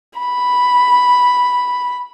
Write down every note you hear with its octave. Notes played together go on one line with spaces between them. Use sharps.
B5